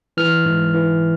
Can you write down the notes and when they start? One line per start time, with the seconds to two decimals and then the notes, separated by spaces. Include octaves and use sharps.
0.17 E3 F6
0.45 G#2
0.74 E3